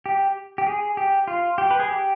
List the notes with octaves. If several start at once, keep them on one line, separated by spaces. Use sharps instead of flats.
G4
G4
G#4
G4
F4
G4
B4
G#4
G4